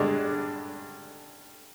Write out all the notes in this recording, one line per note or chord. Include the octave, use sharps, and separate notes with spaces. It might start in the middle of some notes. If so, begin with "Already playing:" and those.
Already playing: G2 D3 G#3 D4 D5